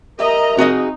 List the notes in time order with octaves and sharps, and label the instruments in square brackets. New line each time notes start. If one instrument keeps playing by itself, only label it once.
[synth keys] G4 E5 [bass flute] A#4 [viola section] D#5 A#5
[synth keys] C4 [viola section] D#4 [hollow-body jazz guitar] F#4 G#4 D#5